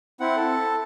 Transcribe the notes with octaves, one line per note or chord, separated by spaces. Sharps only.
C4 E4 F#5
A4